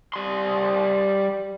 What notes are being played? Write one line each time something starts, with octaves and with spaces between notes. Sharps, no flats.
G3 C6